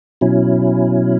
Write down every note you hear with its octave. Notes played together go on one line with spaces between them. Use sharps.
B2 F#3 C#4 E4